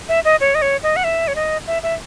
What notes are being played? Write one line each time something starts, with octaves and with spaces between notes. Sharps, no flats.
E5
D#5
C#5
D#5
C#5
D#5
F#5
E5
C#5
D#5
E5
E5